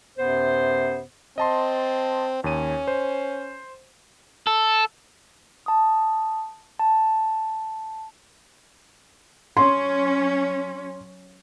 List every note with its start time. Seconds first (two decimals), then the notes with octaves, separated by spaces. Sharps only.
0.18 F#2 C3 B3 C5
1.38 C4 D#5 A5 C6
2.44 D#2 C#4 D#7
2.87 C5
4.47 A4
5.66 A5 D#6
6.79 A5
9.57 F#3 C#4 C6